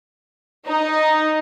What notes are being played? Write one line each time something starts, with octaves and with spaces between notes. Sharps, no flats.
D#4